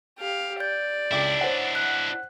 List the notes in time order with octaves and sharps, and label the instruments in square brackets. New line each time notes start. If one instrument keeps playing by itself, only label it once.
[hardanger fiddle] G4 F5
[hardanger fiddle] D5 [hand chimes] G6
[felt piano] C#2 G5 D6 [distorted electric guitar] D4 E4
[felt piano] C5 C#5 F#5
[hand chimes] F#6